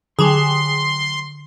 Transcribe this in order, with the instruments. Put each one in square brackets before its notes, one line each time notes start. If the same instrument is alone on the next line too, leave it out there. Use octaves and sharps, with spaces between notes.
[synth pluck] D3 [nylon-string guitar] F#3 A5 [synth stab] G4 G#4 [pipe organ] C6